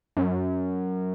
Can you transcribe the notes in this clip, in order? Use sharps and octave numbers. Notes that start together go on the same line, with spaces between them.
F#2